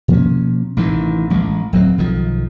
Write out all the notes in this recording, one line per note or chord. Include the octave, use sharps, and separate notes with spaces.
B2 F3 A#3 C#4
A1 C3 D#3 E3
A1 G#3
D1 F#3 C4
B1 D#3 F3